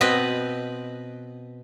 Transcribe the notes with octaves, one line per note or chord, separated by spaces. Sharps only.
B2 C4 B4 D#5